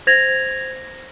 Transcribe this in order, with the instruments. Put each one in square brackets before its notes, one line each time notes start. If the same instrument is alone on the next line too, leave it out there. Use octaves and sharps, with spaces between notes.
[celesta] C5 G#6 A#6 F7